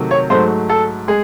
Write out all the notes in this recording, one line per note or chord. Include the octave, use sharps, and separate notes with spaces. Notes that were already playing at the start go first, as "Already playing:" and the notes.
Already playing: C3 D#3 F#3 A3
C#5
G#2 F#3 A3 C5
A4
G#3 G#4